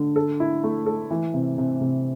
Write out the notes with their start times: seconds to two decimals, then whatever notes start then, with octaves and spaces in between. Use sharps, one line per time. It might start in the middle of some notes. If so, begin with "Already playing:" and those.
Already playing: D3
0.16 A4
0.40 E4
0.64 A3
0.86 A4
1.10 E3
1.34 C3
1.58 C3
1.81 C3